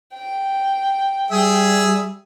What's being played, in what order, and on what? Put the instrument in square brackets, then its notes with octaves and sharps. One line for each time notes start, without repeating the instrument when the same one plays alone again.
[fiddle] G5
[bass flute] G3 [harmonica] G#4 E5 G#5